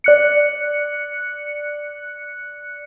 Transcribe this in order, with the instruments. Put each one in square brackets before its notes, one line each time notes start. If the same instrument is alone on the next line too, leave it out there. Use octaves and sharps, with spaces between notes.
[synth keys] D5 F#6 C#7